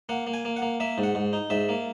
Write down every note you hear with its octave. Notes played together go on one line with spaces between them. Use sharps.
A#3 F#5
A#3
G#5
A#3
F#5
A#3
A#3 E5
G#2
F#5
G#2
D#4
G#2 E5
A#3